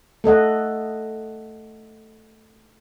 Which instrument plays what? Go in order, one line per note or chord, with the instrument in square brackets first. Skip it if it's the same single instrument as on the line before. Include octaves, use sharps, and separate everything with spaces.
[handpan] A3 A4 D#5 F#5